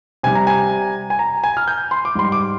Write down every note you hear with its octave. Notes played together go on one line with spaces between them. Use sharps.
C3 G3 G#5
A#5
G#5
G#5
A#5
G#5
F6
G6
C6
D6
G#2 G3 C6
D6